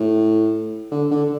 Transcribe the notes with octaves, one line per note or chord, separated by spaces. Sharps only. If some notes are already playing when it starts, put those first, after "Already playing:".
Already playing: A2
D3
D3